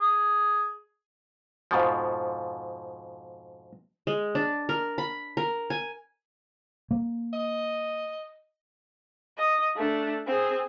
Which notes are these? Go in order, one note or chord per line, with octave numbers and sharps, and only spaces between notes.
G#4
F2 G#2 B2 F3
G#3
D4
A#4
B5
A#4
G#5
A#3
D#5
D#5
A3 D4
C4 G#4